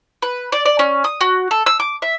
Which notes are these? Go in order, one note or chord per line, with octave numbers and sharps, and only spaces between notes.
B4
D5
D5
C#4
D#6
F#4
A4
E6
D6
E5